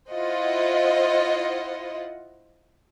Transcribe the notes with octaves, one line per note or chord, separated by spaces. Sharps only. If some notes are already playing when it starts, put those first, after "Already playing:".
E4 F4 C5 D#5 F#5